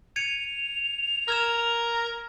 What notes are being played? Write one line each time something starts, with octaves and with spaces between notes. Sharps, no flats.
G#6 C#7 D#7 F7
A#4 F6 G#6 E7